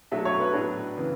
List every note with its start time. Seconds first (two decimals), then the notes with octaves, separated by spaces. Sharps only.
0.11 B2 F#3 A3 D4 E5
0.25 C#5
0.40 B4
0.53 A2 F#3 B3 D4
0.97 C#3 E3 B3